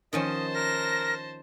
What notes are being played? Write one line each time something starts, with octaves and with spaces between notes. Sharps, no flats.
D#3 F3 C#4 C5 D#5 A5
A#4 A#6